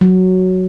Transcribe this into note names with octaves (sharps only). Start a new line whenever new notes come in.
F#3